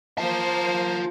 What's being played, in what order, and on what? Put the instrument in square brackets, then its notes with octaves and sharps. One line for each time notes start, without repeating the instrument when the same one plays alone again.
[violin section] A#3 C5 [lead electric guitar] F4 A5